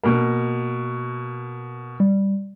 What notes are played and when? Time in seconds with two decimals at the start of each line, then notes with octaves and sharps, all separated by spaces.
0.03 B2 A#3
2.00 G3